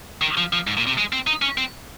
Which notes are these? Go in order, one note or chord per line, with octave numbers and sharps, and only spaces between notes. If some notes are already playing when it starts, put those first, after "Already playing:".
D#3
F3
F3
G#2
A#2
C3
G#3
C4
D#4
C#4
C4